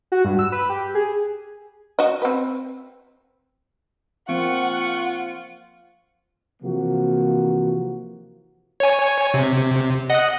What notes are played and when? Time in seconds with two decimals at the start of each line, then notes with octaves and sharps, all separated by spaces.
0.12 F#4
0.25 G2
0.39 E6
0.52 B4
0.70 G4
0.95 G#4
1.99 F#4 D#5
2.22 C4 B4
4.29 F3 A#3 C4 F4 F#5 C#6
6.62 C3 E3 F3 A#3 F#4
8.80 C#5 G#5
9.34 C3
10.10 D#5 F#5